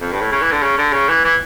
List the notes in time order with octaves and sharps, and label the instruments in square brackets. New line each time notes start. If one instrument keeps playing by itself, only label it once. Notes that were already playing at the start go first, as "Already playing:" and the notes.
[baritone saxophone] F2
G2
A2
C#3
E3
D3
C#3
D3
C#3
E3
E3